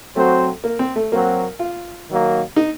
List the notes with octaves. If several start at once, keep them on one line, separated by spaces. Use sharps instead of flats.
F#3 A3 C4 F#4 C5
A#3
C4
A3
F#3 A#3 C4 F#4
F4
D#3 F#3 A#3
D#4